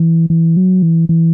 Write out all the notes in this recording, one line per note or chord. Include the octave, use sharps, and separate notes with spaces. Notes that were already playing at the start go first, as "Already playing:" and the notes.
Already playing: E3
E3
F#3
E3
E3